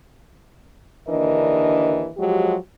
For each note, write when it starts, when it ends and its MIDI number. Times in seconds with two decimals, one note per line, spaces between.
1.08 2.08 39
1.08 2.08 50
1.08 2.08 52
1.08 2.08 62
1.08 2.08 70
1.08 2.08 75
2.17 2.55 53
2.17 2.55 54
2.17 2.55 56
2.17 2.55 66
2.17 2.55 67